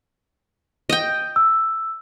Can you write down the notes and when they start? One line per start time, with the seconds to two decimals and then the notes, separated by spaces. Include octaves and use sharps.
0.89 D#5 G5
1.36 E6